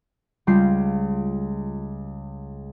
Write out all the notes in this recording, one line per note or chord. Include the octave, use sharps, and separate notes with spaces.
C#2 G3 F4 G6 C7